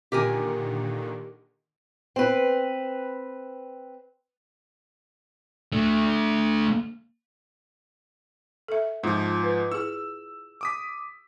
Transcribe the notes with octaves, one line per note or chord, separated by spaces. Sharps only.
A#2 D3 D#3 G4 A#4 G#5
C4 B4
A3 D4
A4 E5
G#2 F3 F4
B4
E4 G#4 E6
D6 D#6 B6